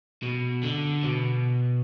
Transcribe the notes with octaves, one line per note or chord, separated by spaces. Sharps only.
B2
D3
B2